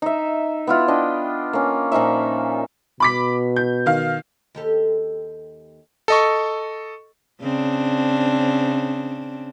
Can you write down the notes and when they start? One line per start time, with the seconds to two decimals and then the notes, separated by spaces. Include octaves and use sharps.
0.02 D#4 E5
0.67 B3 E4 F4
0.88 D4 D#5 G5
1.53 A#3 C#4
1.92 A#2 F3 D#4 E5
3.00 B2 B5 D6 B6
3.56 G6
3.86 D#3 F5
4.55 D#2 G4 A4
6.08 A4 D#5 C#6
7.41 C#3 C4 D4